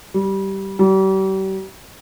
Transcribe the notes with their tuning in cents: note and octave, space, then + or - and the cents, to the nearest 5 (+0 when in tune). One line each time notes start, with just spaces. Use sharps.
G3 -15
G3 -40